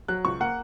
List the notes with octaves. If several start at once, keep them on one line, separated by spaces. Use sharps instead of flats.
F#3 F#6
C#2 C#6
A#3 F#5